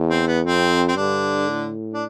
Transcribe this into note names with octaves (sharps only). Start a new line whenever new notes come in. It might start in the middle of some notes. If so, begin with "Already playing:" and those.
Already playing: E2
C4
B3
F2 C4
C4
G2 D3 D4
A2
D4